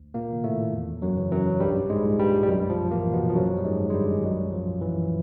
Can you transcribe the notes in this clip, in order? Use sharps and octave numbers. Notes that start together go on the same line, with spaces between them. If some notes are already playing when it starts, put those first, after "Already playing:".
Already playing: D2
A#2 A#3
C3 D#3
A2 A3
E2
F#2 F#3
C#3 E3
F#2 F#3
B1 G2 G3
G#2 G#3
A#2
G2 G3
G3
B1 F#2 F#3
F3
A2 A#2 E3 A#3
B2 B3
F3
G1 F#2 F#3
G3
G#2 G#3
G2 D#3
G#3
G2 G3
B1 F#2 F#3
F3
A#2
E3